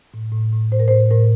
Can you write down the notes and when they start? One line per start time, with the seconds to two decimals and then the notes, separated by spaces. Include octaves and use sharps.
0.14 A2
0.32 A2
0.53 A2
0.72 A2 C5
0.80 A#4
0.88 C5
0.91 A2
1.11 A2 A#4